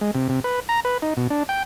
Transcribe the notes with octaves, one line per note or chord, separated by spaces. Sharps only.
G#3
C3
C3
B4
A#5
B4
D#4
B2
D4
G5